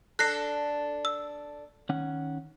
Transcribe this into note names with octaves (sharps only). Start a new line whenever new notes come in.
D4 A4 F#6 A#6 C7
E6
D#3 C#4 F#5